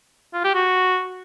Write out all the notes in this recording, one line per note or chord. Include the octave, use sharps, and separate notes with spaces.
F4
G4
F#4